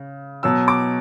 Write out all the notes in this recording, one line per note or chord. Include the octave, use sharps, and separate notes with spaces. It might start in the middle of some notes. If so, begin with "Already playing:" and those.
Already playing: C#3
B2 F#3 E6
D6